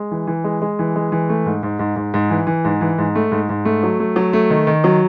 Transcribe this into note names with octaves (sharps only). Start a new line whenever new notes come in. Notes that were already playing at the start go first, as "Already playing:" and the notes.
Already playing: G#3
E3
E3
G#3
G#3
E3
G#3
E3
A3
G#2
G#2
G#2
G#2
G#2
E3
E3
G#2
E3
G#2
A3
G#2
G#2
A3
F#3
A3
F#3
A3
D#3
D#3
F#3